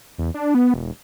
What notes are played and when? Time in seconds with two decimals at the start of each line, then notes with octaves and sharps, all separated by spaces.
0.18 E2
0.34 D4
0.55 B3
0.74 E1